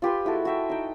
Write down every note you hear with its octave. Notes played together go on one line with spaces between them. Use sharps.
F4 G4 B4 C6
G#3 E4 F#4 A4
F#4 E5 G5
D#4 G5